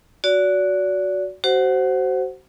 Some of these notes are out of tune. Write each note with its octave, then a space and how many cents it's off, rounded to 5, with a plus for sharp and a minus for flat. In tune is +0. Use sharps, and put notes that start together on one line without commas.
F#4 +0 D5 -30
F#4 +35 C5 +0 F#5 +0